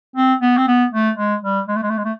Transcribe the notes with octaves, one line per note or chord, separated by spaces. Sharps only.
C4
B3
C4
B3
A3
G#3
G3
G#3
A3
G#3
A3
G#3
A3